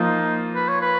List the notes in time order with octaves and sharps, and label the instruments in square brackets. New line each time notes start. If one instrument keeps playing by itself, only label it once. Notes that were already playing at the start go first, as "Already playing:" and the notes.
Already playing: [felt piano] F3 A#3 F4 [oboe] D#4
[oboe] B4
C#5
B4